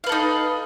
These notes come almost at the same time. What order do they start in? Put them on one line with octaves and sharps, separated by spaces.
F5 B4 A4 D#4